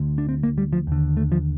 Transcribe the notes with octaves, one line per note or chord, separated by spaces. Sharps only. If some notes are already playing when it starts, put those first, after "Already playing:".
Already playing: D2 D3
D4
C4
A#3
G3
F3
D#2 D3
A3
F3